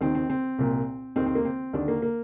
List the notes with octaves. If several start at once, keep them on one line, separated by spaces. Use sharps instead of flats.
D#2 D#3 C4
C4
C4
C2 A#2
D#2 D#3 C4
C4
A#3
C4
D#2 D3 D4
A#3
A#3